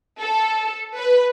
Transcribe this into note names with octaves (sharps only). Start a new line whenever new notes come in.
A4
B4